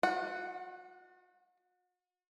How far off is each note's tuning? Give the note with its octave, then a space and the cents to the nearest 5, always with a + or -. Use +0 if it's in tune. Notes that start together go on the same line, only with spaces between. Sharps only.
F#4 -40 F#5 +0